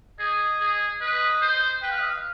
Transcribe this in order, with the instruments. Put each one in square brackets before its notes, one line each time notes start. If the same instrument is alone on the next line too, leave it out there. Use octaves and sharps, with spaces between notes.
[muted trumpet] G#4 [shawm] D#5
[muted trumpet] G#4
[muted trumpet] B4 [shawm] D#5
[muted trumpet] C5
[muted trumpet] B4 [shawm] G5
[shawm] F5
D#5
F5